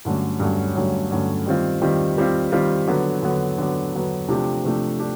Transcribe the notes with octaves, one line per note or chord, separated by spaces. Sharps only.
G2 D3 F#3 A3 C#4
G2 D3 F#3 A3 C#4
G2 D3 F#3 A3 C#4
G2 D3 F#3 A3 C#4
D#3 G3 C4 F4
D#3 G3 C4 F4
D#3 G3 C4 F4
D#3 G3 C4 F4
D3 F#3 B3
D3 F#3 B3
D3 F#3 B3
D3 F#3 B3
C3 F3 A3 D4 G4
C3 F3 A3 D4 G4
D4 G4